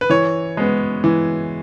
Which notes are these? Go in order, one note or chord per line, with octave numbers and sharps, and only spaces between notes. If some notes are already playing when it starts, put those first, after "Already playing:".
B4
E3 C#5
G#3 B3
E3